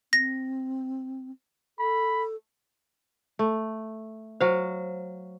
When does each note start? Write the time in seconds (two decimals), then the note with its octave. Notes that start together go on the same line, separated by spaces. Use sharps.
0.13 C4 A#6
1.79 A4 B5
3.39 A3
4.41 F#3 C5 F5